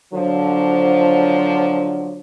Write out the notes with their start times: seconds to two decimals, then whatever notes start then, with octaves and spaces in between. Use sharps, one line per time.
0.13 D3 F3 F#3